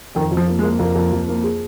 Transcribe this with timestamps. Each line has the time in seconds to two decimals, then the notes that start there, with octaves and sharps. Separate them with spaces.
0.15 F2 D#3
0.31 F2
0.37 F3
0.48 A#3
0.59 G#3
0.63 A#3
0.79 F2 A#3
0.95 F2
1.12 F2
1.28 A#3
1.43 G#4